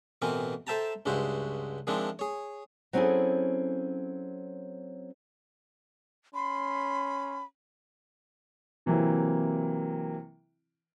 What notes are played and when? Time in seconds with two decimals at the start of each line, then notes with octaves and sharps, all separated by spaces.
0.22 A1 B2 E3 C4 A#4 G#5
0.67 A4 C5 E5 G5 A5 A#5
1.06 C#2 G2 G#3 E4 F#4 C5
1.87 D#3 F3 G#3 C4 D4 E4
2.19 G#4 C#5
2.93 F#3 C4 C#4 E4 G#4 A4
6.34 C#4 B5 C6
8.86 C3 E3 F#3 A#3 C4 E4